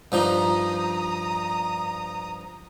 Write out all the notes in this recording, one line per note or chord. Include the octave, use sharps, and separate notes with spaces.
G2 F3 D#4 A#5 D#6